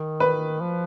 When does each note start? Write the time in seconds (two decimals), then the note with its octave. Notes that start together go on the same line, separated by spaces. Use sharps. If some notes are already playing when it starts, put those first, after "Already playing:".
Already playing: D#3
0.20 B4
0.61 F3